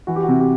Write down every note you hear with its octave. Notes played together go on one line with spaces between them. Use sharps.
E3 F#4
G4
F#4
C3
G4